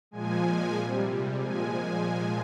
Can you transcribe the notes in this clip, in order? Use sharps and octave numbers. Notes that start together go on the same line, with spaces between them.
A#2 F3 G#3 G#5
C3 G3
A#2 F3 G#3 G#5